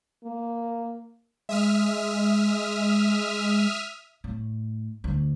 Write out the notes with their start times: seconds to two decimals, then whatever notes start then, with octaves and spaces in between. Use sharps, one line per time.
0.24 A#3
1.49 G#3 E5 D#6 F6
4.24 A2
5.04 D2